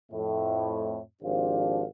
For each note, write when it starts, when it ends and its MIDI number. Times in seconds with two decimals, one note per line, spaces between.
0.12 1.00 41
0.12 1.00 45
1.23 1.84 32
1.23 1.84 53
1.23 1.84 62
1.23 1.84 67
1.23 1.84 72
1.23 1.84 77